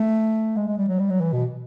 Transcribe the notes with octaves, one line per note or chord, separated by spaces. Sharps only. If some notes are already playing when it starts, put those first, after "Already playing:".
Already playing: A3
G#3
G#3
G3
F#3
G3
F#3
E3
B2